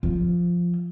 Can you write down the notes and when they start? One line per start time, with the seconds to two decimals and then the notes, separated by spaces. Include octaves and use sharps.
0.03 F3